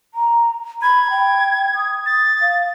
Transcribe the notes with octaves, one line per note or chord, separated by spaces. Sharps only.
A#5
B5 G#6
G5
D#6
A6
F5